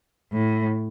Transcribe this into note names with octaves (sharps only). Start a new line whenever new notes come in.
A2